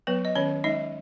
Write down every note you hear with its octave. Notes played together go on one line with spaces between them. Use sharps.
F#3 B3 B4
D#5
D#3 C#4 C#5
G#3 D#4 D#5